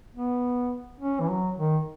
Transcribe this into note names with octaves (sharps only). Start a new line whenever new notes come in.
B3
C#4
E3
F#3
D#3